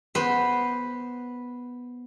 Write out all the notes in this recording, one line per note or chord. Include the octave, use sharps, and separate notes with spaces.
B3 B4 C5 B5